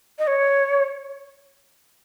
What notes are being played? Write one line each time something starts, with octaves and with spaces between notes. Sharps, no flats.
D#5
C#5